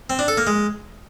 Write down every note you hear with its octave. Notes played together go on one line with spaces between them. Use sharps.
C4
D4
A4
A#3
G#3